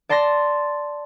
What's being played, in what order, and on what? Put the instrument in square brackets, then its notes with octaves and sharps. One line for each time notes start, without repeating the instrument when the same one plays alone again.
[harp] D5 A5 C6 A6 A#6